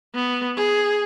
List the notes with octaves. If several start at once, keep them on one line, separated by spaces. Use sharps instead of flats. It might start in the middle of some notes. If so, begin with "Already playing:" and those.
B3
G#4